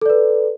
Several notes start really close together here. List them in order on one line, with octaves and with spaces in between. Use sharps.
A4 D5 B4